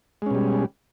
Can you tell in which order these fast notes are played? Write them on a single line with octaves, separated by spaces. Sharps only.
G#3 C#4 B2 G3